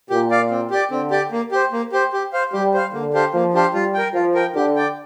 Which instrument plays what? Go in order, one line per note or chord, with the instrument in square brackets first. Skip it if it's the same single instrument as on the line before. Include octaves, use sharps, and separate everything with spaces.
[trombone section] A#2 [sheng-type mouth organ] G4
[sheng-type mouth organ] D5 F5
C4
G4 D5
[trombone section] D3 [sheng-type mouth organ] C4
[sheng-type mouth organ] G4 D5
A#3
G4 C5
A#3
G4 C5
G4
C5 F5
[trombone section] G3 [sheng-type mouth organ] G4
[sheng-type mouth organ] C5 F5
[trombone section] D3 [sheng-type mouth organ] A#3
[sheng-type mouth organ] D4 G4 C5 F5
[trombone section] F3 [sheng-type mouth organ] A#3
[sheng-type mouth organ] D4 G4 C5 F5
[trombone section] G3 [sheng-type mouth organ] F4
[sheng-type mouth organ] A#4 G5
[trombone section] F3 [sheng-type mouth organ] F4
[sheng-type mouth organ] A#4 G5
[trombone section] D3 [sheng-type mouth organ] G4
[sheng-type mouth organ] D5 G5